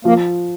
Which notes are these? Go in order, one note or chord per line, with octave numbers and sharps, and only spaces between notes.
F3 A#3